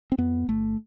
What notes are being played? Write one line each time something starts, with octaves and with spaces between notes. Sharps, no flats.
C4
F2 B3
G1 A3